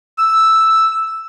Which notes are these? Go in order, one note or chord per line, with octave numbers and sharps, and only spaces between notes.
E6